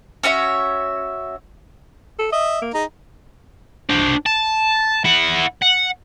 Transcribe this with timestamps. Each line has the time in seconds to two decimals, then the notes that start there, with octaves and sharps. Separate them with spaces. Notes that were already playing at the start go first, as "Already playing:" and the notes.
0.23 C#4 F#4 C#5 E5
2.19 A4
2.32 D#5 E5
2.62 A#3
2.74 D#4 G#4 A#5
3.90 D4 C5
4.26 A5
5.04 E4 F#5
5.62 F#5